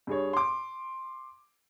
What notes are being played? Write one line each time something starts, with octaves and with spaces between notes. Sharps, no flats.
G2 G#4 C#5
C6 D6